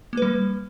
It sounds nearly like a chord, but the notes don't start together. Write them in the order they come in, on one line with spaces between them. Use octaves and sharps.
A#3 B4 G3